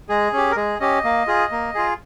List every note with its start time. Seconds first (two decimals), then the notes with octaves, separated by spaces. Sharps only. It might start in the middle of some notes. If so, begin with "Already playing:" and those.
0.09 G#3 G#4
0.33 C#4 G4
0.51 A#4
0.56 G#3 G#4
0.80 C#4 G4 D#5
1.04 A#3
1.27 F4 G#4
1.51 A#3
1.75 F4 G#4